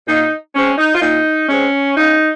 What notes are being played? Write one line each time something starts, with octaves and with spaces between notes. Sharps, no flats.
A#2 D#4
G#3 C4 C#4
D#4
F4
A#2 D#4
G#3 C4 C#4
C#3 D#4